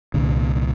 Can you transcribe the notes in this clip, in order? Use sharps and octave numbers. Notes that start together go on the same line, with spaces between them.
C2 A#2 D3